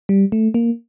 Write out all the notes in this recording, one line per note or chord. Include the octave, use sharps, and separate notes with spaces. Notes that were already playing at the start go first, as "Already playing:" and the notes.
G3
A3
A#3